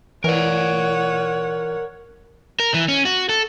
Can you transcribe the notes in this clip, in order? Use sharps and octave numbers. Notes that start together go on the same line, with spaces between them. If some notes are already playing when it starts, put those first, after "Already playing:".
E3 A#4 C#5 D5 F#5
A#4
E3
C#4
F#4
A4